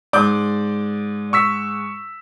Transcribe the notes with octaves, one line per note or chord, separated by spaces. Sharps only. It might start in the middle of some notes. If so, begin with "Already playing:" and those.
G#2 D5 D6 G6
C#6 E6 B6